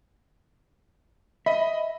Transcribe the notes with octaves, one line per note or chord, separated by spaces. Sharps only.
D#5 E5 B5